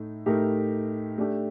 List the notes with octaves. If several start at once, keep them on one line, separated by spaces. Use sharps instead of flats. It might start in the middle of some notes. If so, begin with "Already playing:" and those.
Already playing: A2 A3 D#4
A2 A3 D#4 G4 A#4
A3 D4 G4